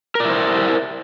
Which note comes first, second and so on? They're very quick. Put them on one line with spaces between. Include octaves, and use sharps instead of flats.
A#4 D5 E4 C5